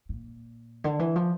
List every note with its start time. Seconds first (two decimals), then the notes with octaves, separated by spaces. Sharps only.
0.09 A#2
0.84 D3
0.99 E3
1.16 F3